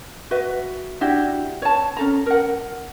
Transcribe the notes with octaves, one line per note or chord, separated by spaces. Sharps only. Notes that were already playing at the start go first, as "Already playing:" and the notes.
F#4 B4 E5
D4 E4 F#4 G4
C#5 A5
C#4 A4 A#5
A#4 F#5